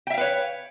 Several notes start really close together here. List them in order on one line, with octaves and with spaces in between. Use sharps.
G5 E5 F5 B4 C#5